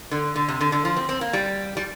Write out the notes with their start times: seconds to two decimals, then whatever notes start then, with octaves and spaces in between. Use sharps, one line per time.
0.11 D3
0.36 D3
0.49 C3
0.61 D3
0.72 D3
0.85 F3
0.97 C4
1.09 C4
1.21 A#3
1.33 G3
1.77 G3